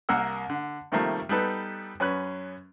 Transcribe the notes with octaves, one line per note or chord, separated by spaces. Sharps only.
C2 A#3 A#4 F#5 E6
D3
C3 D#3 F3 G3 A3 A#3
G3 B3 D#4 A4 B4
F#2 C#4 B4 F#6